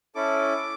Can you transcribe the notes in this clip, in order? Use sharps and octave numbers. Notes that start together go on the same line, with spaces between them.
C#4 E4 A4 D6